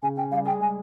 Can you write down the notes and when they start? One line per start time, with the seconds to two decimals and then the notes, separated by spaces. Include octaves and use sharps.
0.02 C#3 G#5
0.16 C#4 G5
0.31 G3 F5
0.45 G#4 G5
0.60 G#3 G#5